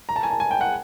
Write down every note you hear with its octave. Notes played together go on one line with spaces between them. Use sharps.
A#5
A5
G#5
A5
G#5
G5
F#5